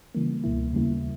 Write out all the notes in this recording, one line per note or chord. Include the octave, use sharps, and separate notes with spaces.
C#3 E3 G3 A#3
C#2 B2 A#3 E4
D#2 C#3 G3 A#3 E4